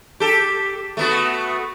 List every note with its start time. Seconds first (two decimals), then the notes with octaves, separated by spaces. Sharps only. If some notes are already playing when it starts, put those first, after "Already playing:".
0.20 G4 A4
0.97 A3 B3 F#4